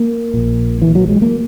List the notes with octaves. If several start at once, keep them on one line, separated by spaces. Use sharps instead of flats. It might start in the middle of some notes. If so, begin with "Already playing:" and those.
Already playing: A#3
A#1 A#2
E3
F#3
G#3
A#3